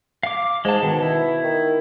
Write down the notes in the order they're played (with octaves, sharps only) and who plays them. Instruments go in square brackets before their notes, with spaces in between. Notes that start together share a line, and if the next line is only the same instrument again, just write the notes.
[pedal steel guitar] F5 D6
[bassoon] G#2 [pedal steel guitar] G#3 A5
[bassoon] B2 [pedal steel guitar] D#3
[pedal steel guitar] E4
[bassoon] D#3